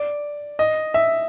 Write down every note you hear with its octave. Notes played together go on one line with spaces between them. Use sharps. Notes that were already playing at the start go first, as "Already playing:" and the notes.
Already playing: D5
D#5
E5